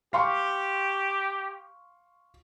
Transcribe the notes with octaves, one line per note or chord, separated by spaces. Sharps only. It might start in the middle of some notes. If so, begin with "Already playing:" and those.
G4 F5 C6 C#6